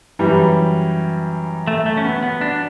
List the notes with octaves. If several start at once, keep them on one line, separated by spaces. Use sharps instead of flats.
F#2 E3 G3
A3
A3
C#4
B3
B3
D4